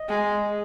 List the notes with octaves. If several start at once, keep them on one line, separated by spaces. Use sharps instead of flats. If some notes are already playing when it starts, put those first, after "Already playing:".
Already playing: D#5
G#3